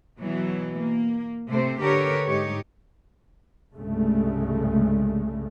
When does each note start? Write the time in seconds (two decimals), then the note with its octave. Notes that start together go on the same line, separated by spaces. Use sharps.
0.19 B2 E3 F#3
0.79 A#3
1.49 C3 A3 C5
1.81 D3 G4 A#4 B4 C#5
2.27 G#2 D#4 G4 C#5
3.73 C2 G2 C#3 G#3 A3